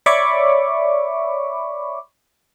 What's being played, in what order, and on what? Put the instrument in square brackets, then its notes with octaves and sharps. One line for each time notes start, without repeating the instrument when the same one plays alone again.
[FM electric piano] C#5 D5 E5 B5 C#6 D6